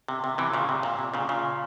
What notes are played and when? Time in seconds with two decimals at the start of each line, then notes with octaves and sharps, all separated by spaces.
0.09 C3
0.24 C3
0.38 C3 E3
0.54 A#2 C#3
0.69 C3
0.83 A#2
0.99 C3
1.14 A#2 C#3
1.29 A#2 C#3